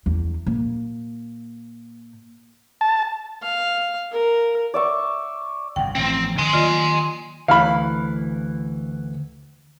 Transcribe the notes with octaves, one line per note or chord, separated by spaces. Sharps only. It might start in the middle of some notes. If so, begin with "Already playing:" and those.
E2
A#2
A5
F5
A#4
D5 E5 C#6
G1 F2 C3 F#5 G5
A1 E3 F3 C4
D3 D#3 G#5 C6
D#3 F#3 A#3 F4 D5 D#5
D2 E3 F5 B5